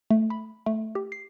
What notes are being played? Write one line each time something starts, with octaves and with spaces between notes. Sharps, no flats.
A3
B5
A3
G4
C7